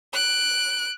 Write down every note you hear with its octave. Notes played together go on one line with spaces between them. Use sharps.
F#6 D7